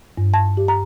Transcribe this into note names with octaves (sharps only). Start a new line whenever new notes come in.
G2
A5
G4
A#5